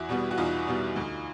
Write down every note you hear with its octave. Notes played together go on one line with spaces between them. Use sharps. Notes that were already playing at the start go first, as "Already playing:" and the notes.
Already playing: E2 E4 F#4
B2 G3 B3
F#4
E2 D#4 F4
B2 G3 B3
D2